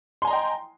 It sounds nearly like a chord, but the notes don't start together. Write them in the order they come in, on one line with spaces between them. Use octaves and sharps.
C6 G#5 A#5 D#5 G5